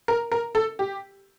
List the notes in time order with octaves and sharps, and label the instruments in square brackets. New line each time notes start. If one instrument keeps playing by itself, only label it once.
[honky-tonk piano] A#4
A#4
A4
G4